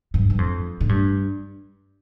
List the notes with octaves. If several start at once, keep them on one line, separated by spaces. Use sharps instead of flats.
G2
G2
F2
A2
G2